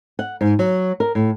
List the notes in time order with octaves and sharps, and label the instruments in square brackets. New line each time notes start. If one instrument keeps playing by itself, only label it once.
[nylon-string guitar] F#5
G#2
F#3
A#4
A2